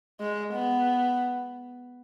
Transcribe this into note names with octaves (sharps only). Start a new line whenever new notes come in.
G#3
B3